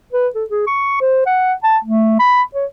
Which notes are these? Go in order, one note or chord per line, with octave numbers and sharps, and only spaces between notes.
B4
A4
G#4
C#6
C5
F#5
A5
A3
B5
C#5